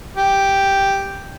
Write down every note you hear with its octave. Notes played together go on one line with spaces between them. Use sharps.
G4